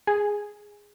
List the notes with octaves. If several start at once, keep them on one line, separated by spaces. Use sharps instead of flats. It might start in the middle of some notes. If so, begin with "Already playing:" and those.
G#4